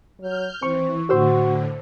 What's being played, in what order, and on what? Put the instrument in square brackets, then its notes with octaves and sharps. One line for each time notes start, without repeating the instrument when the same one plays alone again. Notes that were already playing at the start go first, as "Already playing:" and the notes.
[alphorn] F#3 [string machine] F6 G6
[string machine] E3 [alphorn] C4 [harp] C#6
[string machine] A2 D3 [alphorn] F#4 [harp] C5 E6